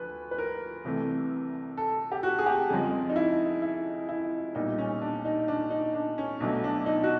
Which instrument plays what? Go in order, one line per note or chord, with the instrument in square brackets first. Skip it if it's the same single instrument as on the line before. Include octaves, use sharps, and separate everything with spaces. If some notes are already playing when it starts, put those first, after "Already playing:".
Already playing: [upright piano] D2 F3 B4
B4
A#4
C2 C3 E3 A3
A4
G4
F#4
G#4
G4
F2 C#3 F3 G#3 G#4
D#4
E4
E4
E4
B1 A#2 G3 D#4
C#4
D4
D#4
D4
D#4
D4
C#4
B1 B2 F#3 A3 D4
D4
D#4
F#4